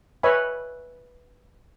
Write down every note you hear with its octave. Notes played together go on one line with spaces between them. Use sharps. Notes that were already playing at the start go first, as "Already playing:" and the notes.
B4 C#5 D#5 E5 G#5 B5